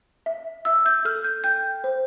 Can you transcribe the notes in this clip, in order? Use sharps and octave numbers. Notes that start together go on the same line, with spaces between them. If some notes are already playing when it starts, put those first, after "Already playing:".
E5
E5 E6
G6
A4 F6
G6
G5 G6
C5